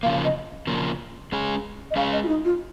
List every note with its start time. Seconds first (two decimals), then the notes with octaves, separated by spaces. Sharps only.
0.03 C#3 F3 A#3 F5
0.24 D#5
0.67 C#3 F3 A#3
1.32 G#3 C#4 G#4
1.91 D#5
1.96 G#3 C#4 G#4 F5
2.12 D#5
2.23 F4
2.28 D#4
2.45 F4